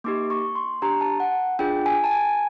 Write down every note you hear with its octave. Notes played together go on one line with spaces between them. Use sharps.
A#3 D#4 G4 D6
C#6
C6
D4 G4 A#5
A5
F#5
D4 F4 G#4 G5
G#5
A5
G#5